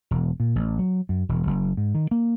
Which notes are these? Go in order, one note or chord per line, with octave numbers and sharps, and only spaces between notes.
E1
A#2
A1
F#3
F#2
E1
F#1
G#2
D#3
A#3